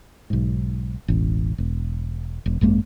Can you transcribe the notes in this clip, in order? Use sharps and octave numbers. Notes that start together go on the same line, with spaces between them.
B1 G#2
E1 A1
E1
E1
G#1 F#2 G#3 A#3